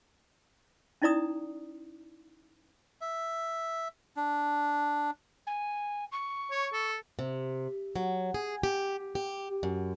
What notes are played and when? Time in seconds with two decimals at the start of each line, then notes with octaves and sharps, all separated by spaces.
1.02 C#4 D#4 E4 D5 A#5 D#6
3.01 E5
4.16 D4
5.46 G#5
6.12 C#6
6.51 C#5
6.73 A4
7.19 C3
7.96 F#3
8.34 G#4
8.63 G4
9.15 G4
9.63 F#2